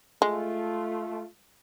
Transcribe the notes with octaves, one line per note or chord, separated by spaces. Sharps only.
G#3 A3 F4